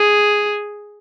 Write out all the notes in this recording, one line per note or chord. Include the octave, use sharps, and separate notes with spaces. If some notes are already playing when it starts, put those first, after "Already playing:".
Already playing: G#4